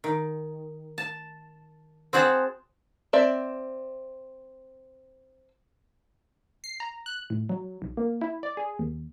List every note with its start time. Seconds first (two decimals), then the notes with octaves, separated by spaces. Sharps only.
0.04 D#3
0.98 A5
2.13 C4 F#4 G#4 F#5 A5
3.13 C4 D5 E5
6.64 C7
6.80 A#5
7.06 F#6
7.30 A2
7.49 F#3
7.82 B1
7.97 A#3
8.21 E4
8.43 D5
8.57 G#4
8.79 D#2